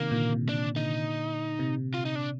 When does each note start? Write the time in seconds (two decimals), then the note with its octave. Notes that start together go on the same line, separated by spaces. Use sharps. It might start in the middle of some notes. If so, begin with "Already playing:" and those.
Already playing: C3 D#3 A#3
0.11 A#2 D3
0.30 C3
0.48 A#2 D4
0.76 A#2 D3 D#4
1.59 C3
1.94 F4
2.05 D#4
2.15 D4